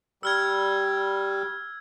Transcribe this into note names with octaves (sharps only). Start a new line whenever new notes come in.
G3 E6 F6 G#6